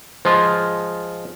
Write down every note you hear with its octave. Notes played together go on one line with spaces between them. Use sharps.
F3 G#3 F4